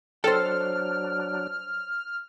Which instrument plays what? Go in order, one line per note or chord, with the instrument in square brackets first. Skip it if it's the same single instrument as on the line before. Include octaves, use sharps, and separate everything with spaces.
[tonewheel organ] F#3 D4 [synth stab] A4 [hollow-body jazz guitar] C5 G5 [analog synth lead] F6